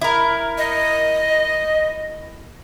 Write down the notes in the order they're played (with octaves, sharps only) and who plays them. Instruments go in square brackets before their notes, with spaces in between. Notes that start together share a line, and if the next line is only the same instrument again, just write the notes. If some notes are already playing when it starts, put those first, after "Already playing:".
[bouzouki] E4 A#4
[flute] D#5